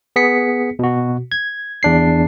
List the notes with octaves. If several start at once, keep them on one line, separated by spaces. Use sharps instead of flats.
B3 G#4 B6 C#7
B2 F#4
G#6
E2 D4 C7